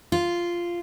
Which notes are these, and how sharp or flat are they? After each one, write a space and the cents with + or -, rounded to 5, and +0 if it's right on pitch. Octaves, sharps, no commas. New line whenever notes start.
F4 -10